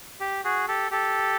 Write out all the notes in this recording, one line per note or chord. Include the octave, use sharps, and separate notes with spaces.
G4
F#4 G#4
G4 A4
G4 A4